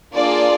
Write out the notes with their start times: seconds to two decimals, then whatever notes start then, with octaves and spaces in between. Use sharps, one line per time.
0.13 A#3 D4 F4 G#4 D5